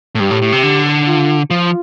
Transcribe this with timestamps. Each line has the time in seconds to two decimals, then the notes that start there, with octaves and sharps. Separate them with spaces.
0.15 A2
0.20 G2 G4
0.31 A2
0.42 A2
0.52 C3
0.63 D3
1.07 F4
1.50 F3 F4